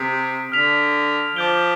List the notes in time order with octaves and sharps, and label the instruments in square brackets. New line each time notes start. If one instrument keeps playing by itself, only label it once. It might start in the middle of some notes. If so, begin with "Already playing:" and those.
Already playing: [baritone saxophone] C3 [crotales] D#6 B6 D7
[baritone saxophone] D3 [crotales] F6 B6 F7
[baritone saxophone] F3 [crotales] D6 G6 D7 G7